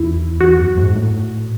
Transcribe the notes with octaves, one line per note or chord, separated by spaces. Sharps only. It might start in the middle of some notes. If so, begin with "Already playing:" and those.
Already playing: E2 E4
E2 F#4
F#2
G#2
A2